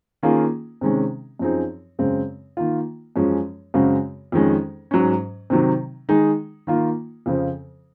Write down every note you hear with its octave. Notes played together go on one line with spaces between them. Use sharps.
D#3 A#3 C#4 F4 G#4
C3 D#3 G#3 C#4
F#2 F3 C4 D#4 G#4
F#2 C#3 G#3 C4
D#3 A#3 F4
F#2 F3 G#3 C#4
F#2 C#3 G#3 C4 F#4
F2 D#3 G#3 C#4
G#2 F#3 C#4
C3 D#3 F#3
D#3 G#3 D#4 G#4
D#3 A#3 F4
F2 C#3 F3 C4